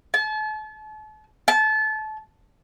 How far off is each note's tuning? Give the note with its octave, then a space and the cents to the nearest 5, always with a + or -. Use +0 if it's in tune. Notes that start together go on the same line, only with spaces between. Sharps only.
A5 -40
A5 -25